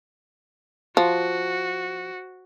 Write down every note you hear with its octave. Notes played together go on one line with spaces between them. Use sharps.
F3 F#4